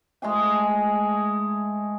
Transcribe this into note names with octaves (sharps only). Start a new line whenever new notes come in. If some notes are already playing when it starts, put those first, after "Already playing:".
G#3 A3 G#4 G#5